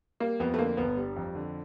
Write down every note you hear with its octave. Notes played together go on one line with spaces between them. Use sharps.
G3 A#3
F2 B3
A3
D3 A#3
G1 B3
G3
F2
D3